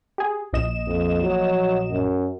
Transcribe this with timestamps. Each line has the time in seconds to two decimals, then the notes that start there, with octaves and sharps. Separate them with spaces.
0.18 G4 G#4 G#5
0.53 A#1 D#5 E7
0.87 F2
1.23 F#3
1.91 F#2